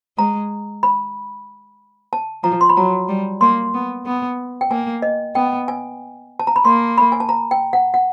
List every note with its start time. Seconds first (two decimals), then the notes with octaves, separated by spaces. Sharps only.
0.18 G#3 A#5
0.83 B5
2.13 A5
2.44 F3 A#5
2.61 C6
2.69 B5
2.77 F#3 A#5
3.08 G3
3.41 A#3 C6
3.74 B3
4.06 B3
4.61 G5
4.71 A#3 G#5
5.02 D#5
5.35 B3 G5
5.68 G#5
6.40 A5
6.47 A#5
6.56 B5
6.65 A#3 C6
6.98 B5
7.12 G#5
7.20 A5
7.29 A#5
7.51 G5
7.73 F#5
7.94 F#5